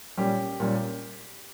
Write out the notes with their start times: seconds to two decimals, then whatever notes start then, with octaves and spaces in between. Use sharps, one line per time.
0.17 A#2 G3 C#4 G4
0.60 A#2 G3 C#4